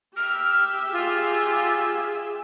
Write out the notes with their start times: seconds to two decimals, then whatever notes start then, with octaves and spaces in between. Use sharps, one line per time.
0.17 G4 E5 F6
0.92 F4 G#4